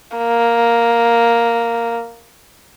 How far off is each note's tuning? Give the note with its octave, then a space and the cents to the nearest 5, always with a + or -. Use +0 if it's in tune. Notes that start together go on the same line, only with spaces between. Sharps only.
A#3 +0